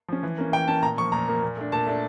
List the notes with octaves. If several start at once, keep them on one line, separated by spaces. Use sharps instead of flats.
F3 C#4
E3
A#3 C#4
E3 G5
A#3 C#4 A5
A#2 A#5
F3 A#3 C#6
A#2 A#5
F3 A#3
A#2
A3 D4
A#2 A5
A3 D4